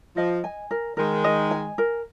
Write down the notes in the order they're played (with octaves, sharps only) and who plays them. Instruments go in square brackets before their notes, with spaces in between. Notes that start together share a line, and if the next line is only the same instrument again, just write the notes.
[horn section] F3 [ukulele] D#5
[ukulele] G#5
A#4
[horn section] D#3 G#3 [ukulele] A#4
[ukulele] D#5
G#5
A#4